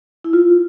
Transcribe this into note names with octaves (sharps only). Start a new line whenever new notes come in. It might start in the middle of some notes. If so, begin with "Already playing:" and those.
E4
F4